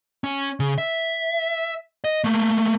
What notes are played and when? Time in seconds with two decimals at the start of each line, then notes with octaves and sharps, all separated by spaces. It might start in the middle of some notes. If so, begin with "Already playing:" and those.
0.24 C#4
0.60 C#3
0.78 E5
2.04 D#5
2.24 A3 A#3